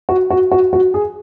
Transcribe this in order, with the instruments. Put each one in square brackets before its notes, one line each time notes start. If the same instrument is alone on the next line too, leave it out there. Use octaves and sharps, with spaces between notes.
[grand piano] F#4
F#4
F#4
F#4
G#4